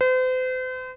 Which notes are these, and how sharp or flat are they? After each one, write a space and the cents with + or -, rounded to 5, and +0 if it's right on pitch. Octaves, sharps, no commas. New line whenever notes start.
C5 -40